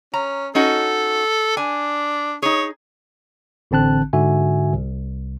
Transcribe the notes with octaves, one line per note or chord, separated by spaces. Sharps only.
C#4 A#5
C#4 D#4 F#4 A4
D4 G#5
D#4 G#4 C#5
A1 D3 C4 A5 F#6
G#2 D3 F#4 E5 G#5
C2